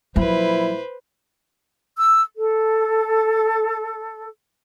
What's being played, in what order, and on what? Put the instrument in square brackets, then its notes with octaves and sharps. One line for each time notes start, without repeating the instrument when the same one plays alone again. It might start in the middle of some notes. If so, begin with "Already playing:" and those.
[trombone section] A#2 E4 [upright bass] F3 F#3 [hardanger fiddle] B4 C5
[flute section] E6
A4